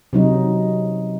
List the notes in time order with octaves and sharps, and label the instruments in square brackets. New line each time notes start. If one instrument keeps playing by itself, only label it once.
[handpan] C3 F#3 D#4